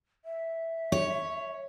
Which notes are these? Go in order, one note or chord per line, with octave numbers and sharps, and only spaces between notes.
E5
C#5